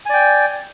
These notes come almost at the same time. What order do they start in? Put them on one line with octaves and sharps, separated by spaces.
G#5 D5 G5